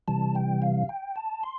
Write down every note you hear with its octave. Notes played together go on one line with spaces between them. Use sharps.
C3 E3 G3 A5
G5
F5
G5
A5
C6